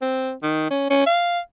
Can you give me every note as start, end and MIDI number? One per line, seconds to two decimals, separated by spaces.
0.02 0.32 60
0.43 0.70 51
0.71 0.89 61
0.90 1.05 61
1.06 1.39 77